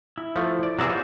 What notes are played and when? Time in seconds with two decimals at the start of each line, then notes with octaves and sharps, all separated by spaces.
0.18 E4
0.36 F3 A3
0.63 D5
0.79 C3 F#3 B3 G#4 D5 E5
0.90 F4 F#4 C5